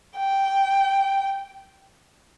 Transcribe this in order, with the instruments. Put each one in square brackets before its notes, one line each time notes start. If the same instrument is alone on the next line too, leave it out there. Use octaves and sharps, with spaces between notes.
[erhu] G5